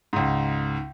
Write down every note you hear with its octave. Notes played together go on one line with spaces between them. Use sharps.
C#2 G#2